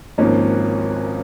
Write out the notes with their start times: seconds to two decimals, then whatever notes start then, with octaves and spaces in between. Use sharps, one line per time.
0.18 G#1 G#2 F3 A#3 C#4